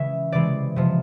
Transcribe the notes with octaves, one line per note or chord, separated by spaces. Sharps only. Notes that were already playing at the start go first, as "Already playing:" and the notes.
Already playing: C#3 E3 G#3 E5
C3 E3 G#3 D5
C3 F3 G#3